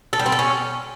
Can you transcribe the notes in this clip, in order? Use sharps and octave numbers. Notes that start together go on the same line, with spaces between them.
A4
G3
C4
A4
C#4